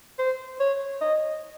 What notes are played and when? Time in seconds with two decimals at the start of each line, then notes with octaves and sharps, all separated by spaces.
0.19 C5
0.60 C#5
1.01 D#5